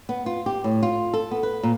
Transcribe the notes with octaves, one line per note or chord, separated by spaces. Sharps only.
B3
F4
G4
A2
F4
A4
B3
B4
A#2